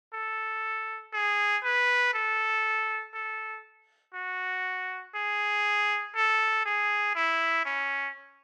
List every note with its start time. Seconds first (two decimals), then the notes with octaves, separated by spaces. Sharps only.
0.13 A4
1.13 G#4
1.64 B4
2.14 A4
3.14 A4
4.14 F#4
5.15 G#4
6.15 A4
6.66 G#4
7.15 E4
7.65 C#4